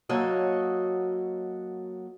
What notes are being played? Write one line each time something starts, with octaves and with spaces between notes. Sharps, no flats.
F#3 A#3 F#4 A4 C#5 D#5